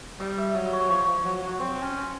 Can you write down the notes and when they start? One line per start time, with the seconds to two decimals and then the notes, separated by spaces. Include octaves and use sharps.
0.19 G3 D#5
0.38 E5
0.55 F#3 D#5
0.73 C#5
0.90 F3 C#5
1.08 F3
1.25 F#3
1.42 F#3
1.60 C4 C5
1.83 C#4